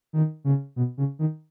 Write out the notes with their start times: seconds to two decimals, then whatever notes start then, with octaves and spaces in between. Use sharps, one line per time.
0.13 D#3
0.44 C#3
0.76 B2
0.98 C#3
1.19 D#3